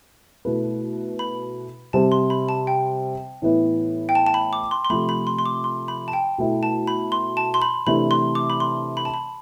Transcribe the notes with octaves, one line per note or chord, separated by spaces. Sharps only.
B2 A3 E4 B4
B5
C3 G3 C4 G4 A5
C6
B5
A5
G5
A2 E3 B3 E4
G5
A5
A5
B5
D6
C6
C6
C3 F3 A3 B5
B5
C6
C6
D6
C6
B5
A5
G5
B2 A3 E4
A5
B5
C6
A5
C6
B5
C3 E3 A3 D4 B5
C6
D6
B5
C6
B5
A5
B5